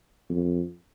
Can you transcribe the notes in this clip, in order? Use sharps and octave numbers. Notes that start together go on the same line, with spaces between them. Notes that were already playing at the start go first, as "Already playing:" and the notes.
F2